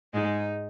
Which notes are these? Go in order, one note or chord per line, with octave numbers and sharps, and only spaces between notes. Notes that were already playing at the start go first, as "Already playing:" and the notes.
G#2 G#3 D#4